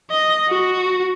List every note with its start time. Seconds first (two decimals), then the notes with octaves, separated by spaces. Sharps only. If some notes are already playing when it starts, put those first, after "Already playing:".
0.10 D#5
0.48 F#4